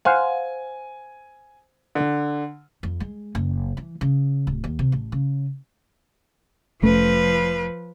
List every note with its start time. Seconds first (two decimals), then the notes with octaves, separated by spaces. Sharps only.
0.05 C5 F5 F#5 G#5
1.95 D3
2.83 F2
3.00 G#3
3.35 F#1
3.77 E3
4.01 C#3
4.47 D1
4.64 D#2
4.79 C3
4.92 A1
5.12 C#3
6.83 F1 F3 A3 C#4 B4